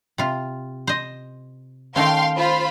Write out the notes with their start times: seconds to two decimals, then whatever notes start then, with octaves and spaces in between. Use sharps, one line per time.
0.18 C3 F4
0.87 C5 D#5
1.96 D#3 A3 C#4 F5 G5 C6
2.36 F4 C5 B5